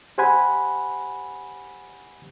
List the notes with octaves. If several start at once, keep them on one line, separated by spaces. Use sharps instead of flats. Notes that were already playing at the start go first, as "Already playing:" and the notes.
G4 C5 F#5 G#5 B5